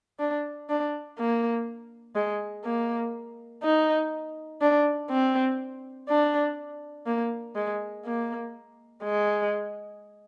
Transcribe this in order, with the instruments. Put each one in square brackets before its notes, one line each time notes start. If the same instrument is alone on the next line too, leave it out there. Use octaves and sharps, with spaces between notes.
[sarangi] D4
D4
A#3
G#3
A#3
D#4
D4
C4
D4
A#3
G#3
A#3
G#3